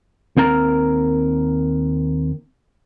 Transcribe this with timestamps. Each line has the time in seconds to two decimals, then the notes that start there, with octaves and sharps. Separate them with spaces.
0.37 D#2 C4 A#4 A#5